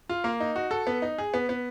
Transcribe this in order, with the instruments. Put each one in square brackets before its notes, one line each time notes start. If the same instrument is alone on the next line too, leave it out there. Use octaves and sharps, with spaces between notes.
[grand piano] F4
A#3
D#4
F#4
A4
B3
D#4
G#4
B3
B3